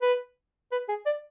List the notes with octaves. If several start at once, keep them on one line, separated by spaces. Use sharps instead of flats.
B4
B4
G#4
D5